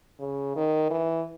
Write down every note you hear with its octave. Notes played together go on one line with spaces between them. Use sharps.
C#3
D#3
E3